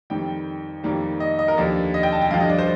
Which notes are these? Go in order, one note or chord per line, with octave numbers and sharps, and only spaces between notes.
F2 D#3 G3 G5
F2 D#3 G3 A#3
D#5
D#5
A#4
D#2 D3 F3 D5
D#5
G5
A5
G5
G2 D3 F3 F5
D#5
D5
C5